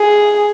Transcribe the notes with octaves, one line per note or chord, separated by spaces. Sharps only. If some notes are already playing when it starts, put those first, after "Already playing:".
Already playing: G#4